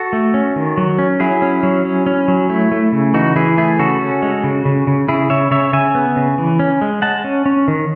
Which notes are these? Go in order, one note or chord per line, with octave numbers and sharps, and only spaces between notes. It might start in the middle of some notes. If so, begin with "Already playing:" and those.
Already playing: F#4 A4
A3
C#4
D#3
F#3
C#4
F#3 E4 G#4
C#4
F#3
C#4
C#4
F#3
A3 E4
A3
C#3
E3 D#4 F#4
E3 E4 G#4
A3 E4 G#4
C#3 F#4 A4
C#4
G#3
C#3
C#3
C#3
C#3 E4 G#4
C#3 C#5 E5
C#3 C#5 E5
C#3 E5 G#5
B3
C#3
E3
C#4
G#3
G#3 F#5 A5
C#4
C#4
D#3